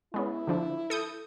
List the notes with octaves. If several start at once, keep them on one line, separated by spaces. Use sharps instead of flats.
G#3 B3 C#4 E4
D3 F3 D4
A4 D#6 G6